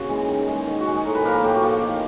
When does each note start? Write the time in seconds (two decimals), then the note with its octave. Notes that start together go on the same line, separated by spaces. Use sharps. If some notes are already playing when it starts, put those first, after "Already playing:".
Already playing: C#3 A#3 F#4
0.09 E3 G#3
0.28 D#3
0.48 G#3
0.67 D#3
0.80 F#4
0.87 G#3
0.92 G#4
1.05 A2 A#4
1.15 B4
1.25 F3 A#3 A#4
1.35 A4
1.44 A2 G4
1.54 F#4
1.63 F3 A#3 F4
1.82 D#3